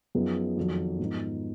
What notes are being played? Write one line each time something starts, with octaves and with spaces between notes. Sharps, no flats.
F#2 F3 B3 D#4 G#4
F2 D#3 F#3
G#2 F3 B3 D#4